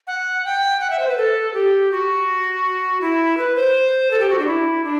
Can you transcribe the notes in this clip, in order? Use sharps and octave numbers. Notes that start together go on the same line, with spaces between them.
F#5
G5
F#5
E5
C5
B4
A4
G4
F#4
E4
B4
C5
A4
G4
F#4
D4
E4
D4